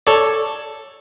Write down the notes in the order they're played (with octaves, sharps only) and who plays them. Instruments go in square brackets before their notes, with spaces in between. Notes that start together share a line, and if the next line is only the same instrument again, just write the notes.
[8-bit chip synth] A4 C#5 D5